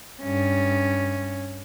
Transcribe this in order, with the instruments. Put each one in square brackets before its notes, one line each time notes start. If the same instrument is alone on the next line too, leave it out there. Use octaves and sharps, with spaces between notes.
[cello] G2 C#4